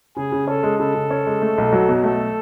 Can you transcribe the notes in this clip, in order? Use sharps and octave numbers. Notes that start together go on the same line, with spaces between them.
C#3 G#4
C#3
C#4 A4
G#3
C#3 A4
C#3
C#4
G#3
A3
B1
F#3
B2
A3 A4